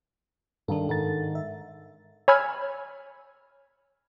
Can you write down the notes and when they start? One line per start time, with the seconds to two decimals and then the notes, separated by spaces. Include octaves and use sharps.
0.68 G2 D#3 D4 A4
0.89 G#2 D#3 A4 A6
1.35 E5
2.28 C#5 G#5 B5 E6 F6 G#6